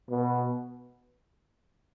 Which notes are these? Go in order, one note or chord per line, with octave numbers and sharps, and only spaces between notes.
B2